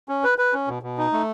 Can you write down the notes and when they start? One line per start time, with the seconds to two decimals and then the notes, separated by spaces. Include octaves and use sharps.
0.09 C#4
0.24 B4
0.38 B4
0.53 C#4
0.68 B2
0.83 B2
0.98 D#4
1.13 A3